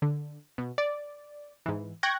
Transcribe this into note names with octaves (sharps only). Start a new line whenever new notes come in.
D3
B2
D5
G#2 E3
G5 C#6 F#6 G#6 A#6